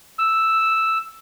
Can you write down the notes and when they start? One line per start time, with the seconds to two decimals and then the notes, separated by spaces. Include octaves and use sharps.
0.19 E6